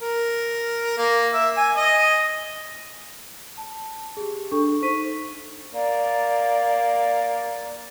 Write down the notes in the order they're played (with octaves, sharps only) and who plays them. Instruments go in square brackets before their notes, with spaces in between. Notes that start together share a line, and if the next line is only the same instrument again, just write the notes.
[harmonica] A#4
A#3
E5
G#5
D#5
[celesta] A5
G4 G#4
D4 A4 C#6
D#4 C5 C#6 B6 D#7
[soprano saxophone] A#3 [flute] D5